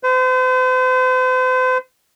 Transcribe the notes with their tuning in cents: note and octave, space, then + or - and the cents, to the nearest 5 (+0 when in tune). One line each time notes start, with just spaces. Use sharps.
C5 -40